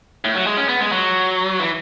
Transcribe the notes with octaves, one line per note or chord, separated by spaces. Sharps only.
A2
F#3
G#3
C#4
B3
G#3
F#3
E3